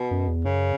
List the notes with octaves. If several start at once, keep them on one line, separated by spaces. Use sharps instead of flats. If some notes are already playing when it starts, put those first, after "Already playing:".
Already playing: B2
F#2
E2
F#2 C#3